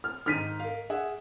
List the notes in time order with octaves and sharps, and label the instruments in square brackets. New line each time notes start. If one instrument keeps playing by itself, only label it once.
[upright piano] F6
[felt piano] G#2 D#3 D#4 [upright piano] F6 B6 D#7
[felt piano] A#4 F5
G#4 E5 F#5